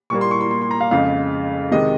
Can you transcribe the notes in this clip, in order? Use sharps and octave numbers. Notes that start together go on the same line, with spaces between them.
A#2 G3 A#3 C#6
C6
C#6
C6
C6
C6
A#5
F5
F2 C#3 G#3 F5
C3 D#3 G#3 D#5